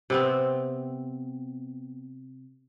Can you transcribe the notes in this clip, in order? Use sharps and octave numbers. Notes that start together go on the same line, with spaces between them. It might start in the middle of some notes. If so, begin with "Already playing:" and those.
C3 B3 C4